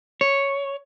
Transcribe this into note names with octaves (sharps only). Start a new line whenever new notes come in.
C#5